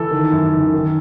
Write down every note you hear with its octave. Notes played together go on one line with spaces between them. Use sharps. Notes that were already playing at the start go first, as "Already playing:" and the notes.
Already playing: E3 A4
D#3
F#2
D#3
D#3